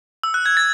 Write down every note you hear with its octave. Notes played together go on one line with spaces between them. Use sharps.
E6
F#6
G#6
A6